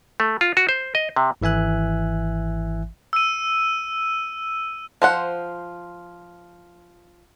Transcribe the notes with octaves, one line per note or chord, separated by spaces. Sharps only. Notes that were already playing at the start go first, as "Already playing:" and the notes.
A3
F4
F#4
C5
D#5
C3
G#1 E3 E5 G#5 F#6
E6 D#7
F3 C5 F#5